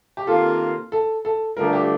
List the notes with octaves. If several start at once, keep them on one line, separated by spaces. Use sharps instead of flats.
G4
C3 D#3 A#3 F4 A4
A4
A4
G2 D3 F3 A3 D4 A#4
G4